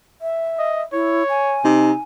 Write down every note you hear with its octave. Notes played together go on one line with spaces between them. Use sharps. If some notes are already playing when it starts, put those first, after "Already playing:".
E5
D#5
E4 C#5
G#5
C3 D#4